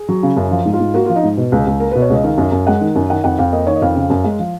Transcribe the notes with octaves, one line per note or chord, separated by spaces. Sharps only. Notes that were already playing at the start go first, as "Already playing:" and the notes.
Already playing: G#4
F#3
C#3
F#2
F3
G#2
F4
G#2
A#3 F#4
F3 F4
D#4
G#2
B2
C#2
C#2
A#3 A#4
B2 B4
C#5
C#2 D#5
D#3 F5
F#2
F#2
G#3 F#5
D#3
F#2
D#3 F#5
F2 F#5
F2 F5
A#3 D#5
D#3 C#5
D#5
F2 F5
C#3
F#2
G#3
F3